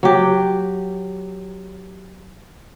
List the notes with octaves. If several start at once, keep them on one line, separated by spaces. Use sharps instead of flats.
F#3 G4